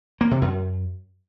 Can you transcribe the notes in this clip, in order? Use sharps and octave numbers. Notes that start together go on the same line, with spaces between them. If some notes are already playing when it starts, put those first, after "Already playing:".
A#3
C3
F#2